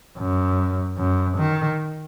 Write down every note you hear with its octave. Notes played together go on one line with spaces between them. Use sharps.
F#2
F#2
D#3